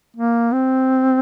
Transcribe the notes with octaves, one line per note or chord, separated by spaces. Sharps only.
A#3
C4